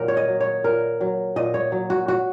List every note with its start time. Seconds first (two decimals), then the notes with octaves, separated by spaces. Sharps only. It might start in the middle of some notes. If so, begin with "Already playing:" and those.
Already playing: A#2 D#3 F#3 A#4
0.08 C#5
0.17 D#5
0.28 F#3
0.40 C#5
0.64 A#2 A#4
1.01 F#3
1.36 A#2 D#5
1.54 C#5
1.72 F#3
1.90 F#4
2.08 F#4